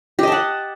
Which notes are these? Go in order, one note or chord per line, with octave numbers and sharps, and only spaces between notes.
G4 D#5 F#5 A5